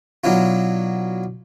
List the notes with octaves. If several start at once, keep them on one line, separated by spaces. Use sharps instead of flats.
B2 F#3 D4 E4 F4